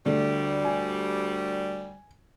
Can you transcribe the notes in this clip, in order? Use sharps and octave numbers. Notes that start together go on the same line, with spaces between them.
D2 D3 G3 A3
G#5